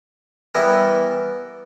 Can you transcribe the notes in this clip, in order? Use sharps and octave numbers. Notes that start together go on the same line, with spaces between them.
E3 G3 B3 E4 A#4